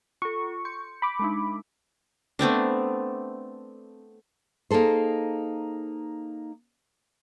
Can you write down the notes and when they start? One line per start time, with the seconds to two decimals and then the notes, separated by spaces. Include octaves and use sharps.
0.22 F4 A4 C#6
0.65 C6 G6 C#7
1.02 B5 D6
1.19 G#3 D4 D#4
2.39 A3 B3 C4 D4
4.71 A#3 D#4 G#4 A4 C5